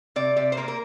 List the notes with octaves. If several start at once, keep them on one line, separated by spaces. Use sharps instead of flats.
C3 D5
C3 D5
C5
A#3 A#4
A#4